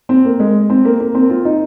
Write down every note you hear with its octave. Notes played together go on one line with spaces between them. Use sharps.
C4
A#3
G#3
C4
A#3
A#3
C4
F4
D#4